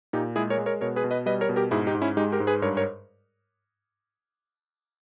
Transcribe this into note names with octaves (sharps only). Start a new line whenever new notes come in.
A#2 D#4 G4
G#3 E4 G#4
A#4 C#5
G#3
A#4 C#5
B2 A#4 C#5
G#4 B4
B2
B4 D#5
G3 B4 D#5
A#4 C#5
B2
G4 A#4
G#2 E4 G#4
D#4 G4
G#2
C#4 E4
G#3 D#4 G4
G4 A#4
G#2
G#4 B4
G2 A#4 C#5
A#4 C#5